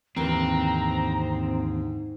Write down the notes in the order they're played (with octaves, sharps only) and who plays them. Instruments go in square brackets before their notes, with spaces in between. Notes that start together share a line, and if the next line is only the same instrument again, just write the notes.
[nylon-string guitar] D#2 D3 E3 [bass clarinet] G#2 [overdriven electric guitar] C4 [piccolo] A#5